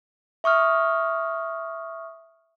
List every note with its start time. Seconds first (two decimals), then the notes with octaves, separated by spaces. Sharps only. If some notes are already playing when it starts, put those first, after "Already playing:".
0.44 E5 C#6 D#6 F6